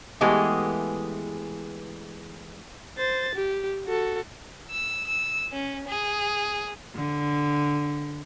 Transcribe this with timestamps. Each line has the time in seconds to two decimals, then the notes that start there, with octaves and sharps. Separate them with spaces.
0.21 E3 G#3 A3 B3 G4 G#4
2.98 C5 A6
3.35 G4
3.87 F#4 A4
4.71 E6
5.07 E6
5.52 C#4
5.88 G#4
6.95 D3